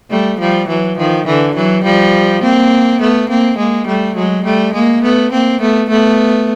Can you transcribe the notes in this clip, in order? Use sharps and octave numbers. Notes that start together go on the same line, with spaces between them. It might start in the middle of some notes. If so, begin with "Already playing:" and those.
G3 A3
F3 G3
E3 F#3
D#3 F3
D3 E3
E3 F#3
F3 G3
A#3 C4
A3 B3
A#3 C4
G#3 A#3
G3 A3
F#3 G#3
G3 A3
G#3 A#3
A3 B3
A#3 C4
A3 B3
A3 B3